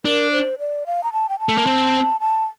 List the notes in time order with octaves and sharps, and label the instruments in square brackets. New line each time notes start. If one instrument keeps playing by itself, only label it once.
[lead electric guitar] D4 [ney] A#4
[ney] C5
D5
F5
A#5
A5
G5
A5
[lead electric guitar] A3
A#3
C4
[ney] A5